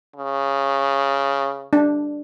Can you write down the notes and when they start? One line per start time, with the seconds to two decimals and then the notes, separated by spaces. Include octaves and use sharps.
0.16 C#3
1.73 D4